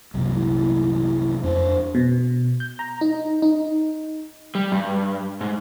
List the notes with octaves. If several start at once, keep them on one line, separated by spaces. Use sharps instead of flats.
C2 F#2 A#2
E4
F2 D4 C5
B2
G6
A#5
D#4
D#4
G3
G2
G#2